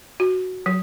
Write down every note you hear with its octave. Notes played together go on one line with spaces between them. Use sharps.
F#4
F#3